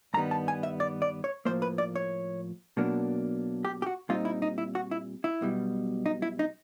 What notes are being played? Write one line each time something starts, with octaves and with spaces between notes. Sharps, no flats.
G2 D#3 G3 B3 A#5
A5
G#5
E5
D5
D5
C#5
A2 F3 A#3 C5
B4
D5
C#5
B2 F#3 A#3 D4
G4
G4
F#4
A#2 G3 C4 D#4 F4
E4
D#4
E4
F#4
E4
E4
B1 B2 G3
D#4
E4
D#4